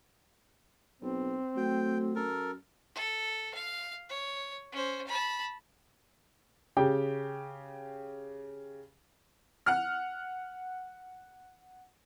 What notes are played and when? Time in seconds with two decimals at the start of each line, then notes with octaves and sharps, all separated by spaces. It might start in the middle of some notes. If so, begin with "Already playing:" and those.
1.02 B1 C4
1.57 F#3 A3 G5
2.16 F#2 A4 A#4
2.95 A4
3.54 F5
4.09 C#5
4.72 C#4 C5
5.07 A5 B5
6.77 C#3 G4 G5
9.66 F#5 F6